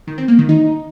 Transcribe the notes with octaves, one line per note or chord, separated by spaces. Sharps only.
D#3
C4
A#3
D#3
D#4